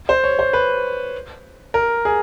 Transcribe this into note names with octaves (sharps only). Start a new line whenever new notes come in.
C5
C#5
C5
B4
A#4
G#4